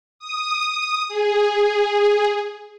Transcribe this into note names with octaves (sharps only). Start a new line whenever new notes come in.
D#6
G#4